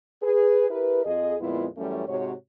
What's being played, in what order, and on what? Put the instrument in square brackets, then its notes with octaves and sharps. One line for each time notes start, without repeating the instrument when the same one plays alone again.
[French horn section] G#4 B4
E4 G4 A#4 B4
F2 G#4 D#5
F2 A#2 G#3 B3 E4 F4
F#2 E3 G3 A3 C#4
G#2 C3 F#4 C#5